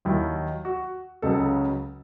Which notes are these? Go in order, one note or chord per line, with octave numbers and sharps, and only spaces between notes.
D#2 D#3 F#3 E4
F#4
C#2 C#3 F#3 A4